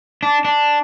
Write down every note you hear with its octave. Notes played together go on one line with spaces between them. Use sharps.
D4
D4